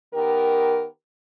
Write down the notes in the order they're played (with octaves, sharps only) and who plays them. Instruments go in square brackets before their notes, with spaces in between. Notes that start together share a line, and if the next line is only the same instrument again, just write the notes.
[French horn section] D#3 B3 G4 A#4